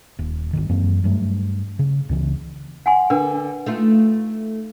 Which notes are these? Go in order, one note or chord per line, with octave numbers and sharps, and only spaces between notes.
D#1
G1 C2 D#3
F#2 E3 A#3 C4
G2 F#3 A3
C#3
C#2 C#3 E3
F#5 G#5 C6
D3 D4 A#4 B4
A3 D#4 F4